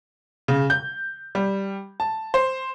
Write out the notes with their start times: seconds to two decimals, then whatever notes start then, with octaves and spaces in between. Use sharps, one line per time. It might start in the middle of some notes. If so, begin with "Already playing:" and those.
0.48 C#3
0.70 G6
1.35 G3
2.00 A5
2.34 C5